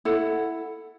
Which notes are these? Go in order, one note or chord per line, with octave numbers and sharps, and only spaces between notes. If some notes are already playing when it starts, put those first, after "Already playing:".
E4 A4 F#5